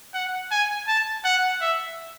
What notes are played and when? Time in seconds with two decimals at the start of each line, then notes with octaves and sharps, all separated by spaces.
0.14 F#5
0.51 G#5
0.88 A5
1.25 F#5
1.61 E5